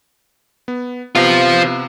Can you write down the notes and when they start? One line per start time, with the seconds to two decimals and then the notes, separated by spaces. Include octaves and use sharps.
0.68 B3
1.15 C3 F3 B3 F4